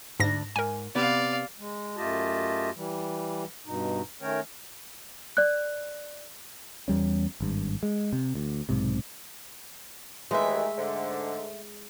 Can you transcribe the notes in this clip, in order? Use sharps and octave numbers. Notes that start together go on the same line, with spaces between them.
D2 G#2 D4 A#6
G#2 A#4 G#5
C3 B3 B4 D5 F5
G#3
F#2 A3 F4 G4 D#5 A5
E3 G3
G2 B2 D#4
D#3 A3 C#4 A#4 C#5 G5
D5 F#6
E2 G3 C#4
G#1 G2
G#3
C3
D2
B1 G#2 C3
D#2 D#3 E3 G#3 A3 E5
G#2 D3